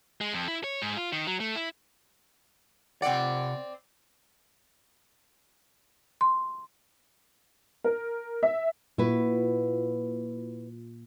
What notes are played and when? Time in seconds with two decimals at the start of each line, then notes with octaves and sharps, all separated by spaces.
0.21 G#3
0.34 F2
0.48 E4
0.64 C#5
0.82 G#2
0.97 F4
1.12 D#3
1.27 F#3
1.40 A3
1.56 E4
3.02 C3 C4 D5 F#5
6.21 C6
7.84 A#4
8.43 E5
8.98 A#2 E4 F#4 B4